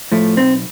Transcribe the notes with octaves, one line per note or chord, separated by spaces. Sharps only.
A2 F3 A3
B1 C4